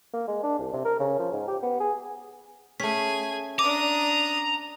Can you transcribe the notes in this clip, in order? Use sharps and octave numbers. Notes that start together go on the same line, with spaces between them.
A#3
G#3
D4
C2
C3
A#4
C#3
F3
G#2
G4
B3
G#4
A3 C#4 G#4 G#5 B6
D4 A#5 D6 D#6